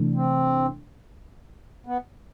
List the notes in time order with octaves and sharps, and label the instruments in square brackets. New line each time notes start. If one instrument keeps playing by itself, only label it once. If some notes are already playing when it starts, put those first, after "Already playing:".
Already playing: [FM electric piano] C3 E3 A3 D4
[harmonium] C4
B3